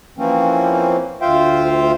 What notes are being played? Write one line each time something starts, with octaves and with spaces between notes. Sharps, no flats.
E3 F3 A#3 C4 C#4
D2 F4 C5 E5 F5 G5